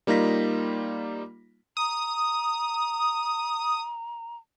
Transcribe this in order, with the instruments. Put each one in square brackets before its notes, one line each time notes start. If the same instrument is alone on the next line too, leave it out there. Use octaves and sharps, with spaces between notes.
[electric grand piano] G3 A#3 D#4 F4 A#6 B6
[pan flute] A#5 [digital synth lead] D#6